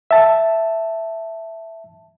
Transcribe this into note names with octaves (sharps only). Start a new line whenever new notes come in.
E5 A5